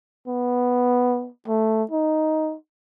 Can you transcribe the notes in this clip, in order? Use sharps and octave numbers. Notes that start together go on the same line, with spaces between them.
B3
A3
D#4